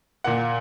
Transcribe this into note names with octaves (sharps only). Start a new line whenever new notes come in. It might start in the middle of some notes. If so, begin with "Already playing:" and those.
A#2 A#3 F#5